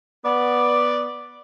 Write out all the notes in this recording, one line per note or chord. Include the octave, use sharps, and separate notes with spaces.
B3 D5